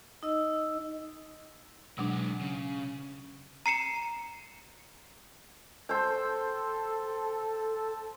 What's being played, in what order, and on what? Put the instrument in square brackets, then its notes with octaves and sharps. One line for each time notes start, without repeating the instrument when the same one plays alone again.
[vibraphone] D#4 D#5 E6
[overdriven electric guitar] B1 G#3 [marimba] B2 F#3 D4
[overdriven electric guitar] C#3
[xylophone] A#5 C7 C#7 E7
[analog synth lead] A4 [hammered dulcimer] C5 G5